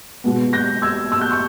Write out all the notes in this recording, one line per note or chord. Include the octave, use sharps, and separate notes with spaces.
B2 G#3 B3
G6 A#6
E6 G#6
E6
G6
C#6 E6